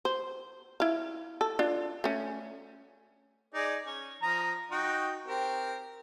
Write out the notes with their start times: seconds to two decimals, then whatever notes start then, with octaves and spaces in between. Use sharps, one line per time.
0.05 C5
0.80 E4 F5
1.41 A4
1.59 D4 F4
2.04 A3 C#4
3.54 D#4 G#4 D5
3.87 C#4
4.23 F3 A#5 D#6
4.71 D#4 F#4 G5
5.27 C4 G4 A#4